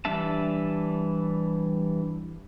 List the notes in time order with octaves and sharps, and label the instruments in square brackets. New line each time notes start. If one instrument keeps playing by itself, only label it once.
[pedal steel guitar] E3 G3 D4 E5 A5